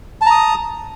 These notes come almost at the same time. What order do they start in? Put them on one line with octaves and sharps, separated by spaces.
A5 A#5 D#6